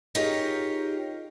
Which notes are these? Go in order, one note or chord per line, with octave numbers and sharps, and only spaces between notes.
D#4 F4 G4 G#4 A#4 C#5